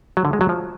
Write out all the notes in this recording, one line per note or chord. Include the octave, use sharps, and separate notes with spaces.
F#3
D3
G#3
F#3
F3